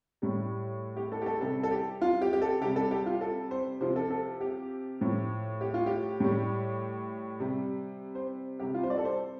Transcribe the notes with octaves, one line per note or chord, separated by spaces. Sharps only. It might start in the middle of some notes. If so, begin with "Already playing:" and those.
A2 G3
G4
A4
G4
A4
C3 G3 A4
A4
G4
F4
G4
G4
A4
C3 G3 G4
A4
G4
F4
A4
C5
C3 F3 C5
A4
A4
G4
A2 F3
G4
F4
G4
A2 G3
C3 G3
C5
C3 G3 G4
F4
C5
D5
A4
C5